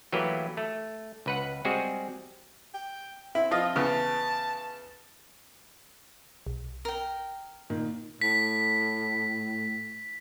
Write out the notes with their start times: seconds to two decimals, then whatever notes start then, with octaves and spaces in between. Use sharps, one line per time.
0.12 E3 F#3 A3 A#3 G4 B4
0.57 A3
1.26 C#2 B4 F#5
1.65 G3 G#3 C4 F#4 G#4
2.74 G5
3.35 C4 E4
3.51 F3 F4 D#5
3.76 C#3 E3 B3 A5
6.47 B1
6.85 A#4 G5
7.70 A#2 D#3
8.21 A2 B6